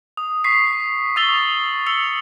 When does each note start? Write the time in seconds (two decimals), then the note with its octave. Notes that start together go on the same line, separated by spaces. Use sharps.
0.17 D#6
0.44 C#6 B6 C7
1.16 C#6 D#6 E6 A6 F7 G7
1.87 E6 C#7 F7 G7